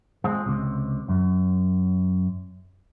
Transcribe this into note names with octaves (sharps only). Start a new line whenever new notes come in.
G#3 C4 F4 G#4
C#2 C3
F#2